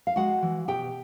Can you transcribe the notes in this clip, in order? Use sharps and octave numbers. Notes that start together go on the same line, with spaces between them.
F5
G#3 F#4 F#5
E3
B2 G4 G5